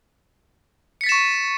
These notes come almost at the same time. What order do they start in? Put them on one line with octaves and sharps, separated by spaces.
C#7 B6 A6 E7 C#6